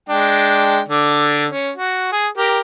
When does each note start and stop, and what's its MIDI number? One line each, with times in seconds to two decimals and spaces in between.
0.09 0.80 56
0.09 0.80 62
0.09 0.80 79
0.88 1.46 50
0.88 1.46 74
1.50 1.71 61
1.77 2.08 66
2.12 2.28 68
2.38 2.60 67
2.38 2.60 70